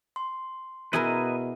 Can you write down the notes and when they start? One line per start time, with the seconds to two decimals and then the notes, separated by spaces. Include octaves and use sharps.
0.16 C6
0.93 B2 E4 G#4 A#4 B4 D#5 G#5